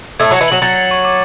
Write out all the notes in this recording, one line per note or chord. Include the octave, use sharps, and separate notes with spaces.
A2 A3 G#6
F#3 C#7
E3
F#3 F#7
F#3 A6
A6
C#6
D6